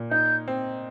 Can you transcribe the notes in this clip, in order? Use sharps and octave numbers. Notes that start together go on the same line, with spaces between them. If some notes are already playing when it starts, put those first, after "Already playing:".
Already playing: A#2
D#4 G6
C4